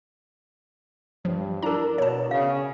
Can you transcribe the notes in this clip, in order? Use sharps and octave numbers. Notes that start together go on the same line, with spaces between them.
G2 F3
D4 E4 A#4 A#5
B2 C#5 A5
C#3 F5